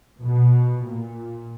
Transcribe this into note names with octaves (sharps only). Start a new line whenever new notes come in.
B2
A#2